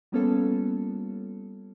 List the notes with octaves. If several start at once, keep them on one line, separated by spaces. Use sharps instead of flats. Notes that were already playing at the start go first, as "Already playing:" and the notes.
G3 A#3 B3 C#4 F4 A4